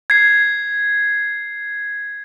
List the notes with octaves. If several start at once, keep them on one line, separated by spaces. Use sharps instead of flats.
G#6 C7